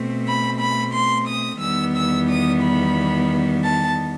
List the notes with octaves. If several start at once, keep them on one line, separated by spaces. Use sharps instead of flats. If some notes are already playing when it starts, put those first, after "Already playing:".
Already playing: B2 A3 C4
B5
B5
C6
D#6
E2 D#3 G3 B3 E6
E6
D#6
B5
A5